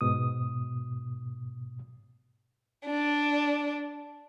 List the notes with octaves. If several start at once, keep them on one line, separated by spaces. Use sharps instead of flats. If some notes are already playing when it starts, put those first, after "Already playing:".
G#2 B2 D#6
D4